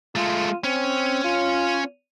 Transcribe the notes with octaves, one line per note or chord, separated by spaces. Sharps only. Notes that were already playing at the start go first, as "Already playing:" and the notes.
G#3 A3 F4
C4 C#4
F4